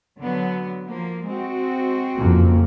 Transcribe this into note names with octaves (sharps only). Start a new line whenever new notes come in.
D3 F#3 B3
F3 A#3
G#3 C4 F#4
F#1 F2 A#3